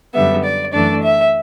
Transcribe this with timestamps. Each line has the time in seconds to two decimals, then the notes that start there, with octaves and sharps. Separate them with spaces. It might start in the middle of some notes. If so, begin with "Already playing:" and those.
0.14 F#2 D3 G3 B3 E5
0.44 D5
0.74 F#2 E3 A3 D4 D5
1.04 E5